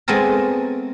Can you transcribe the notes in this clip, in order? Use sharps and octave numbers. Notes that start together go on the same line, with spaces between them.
G#3 A3 B3 C4 A#4